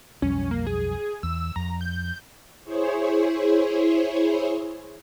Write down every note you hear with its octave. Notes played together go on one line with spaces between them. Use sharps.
B1 F2 G3 C#4
A#3
G#4
E2 E6
F2 A#5
G6
E4 G#4 C5 C#5